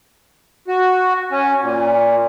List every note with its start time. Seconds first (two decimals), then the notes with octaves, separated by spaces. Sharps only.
0.68 F#4
1.31 C#4
1.62 A#2